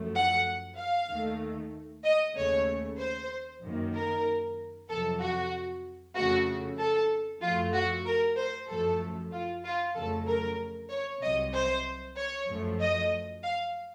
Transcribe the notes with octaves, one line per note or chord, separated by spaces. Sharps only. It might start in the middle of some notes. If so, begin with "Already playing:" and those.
Already playing: F#2 F3 A3
F#5
F5
D#2 D#3 A3
D#5
D#2 C#3 A3 C#5
C5
F#2 D#3 A#3
A#4
F2 C3 F#3 A4
F#4
F2 C#3 A3 F#4
A4
F#2 F3 A3 F4
F#4
A#4
C5
F#2 F3 A3 A4
F4
F4
F2 C#3 F#3 A3 A4
A#4
C#5
C2 C3 F#3 D#5
C5
C#5
F#2 F3 A3
D#5
F5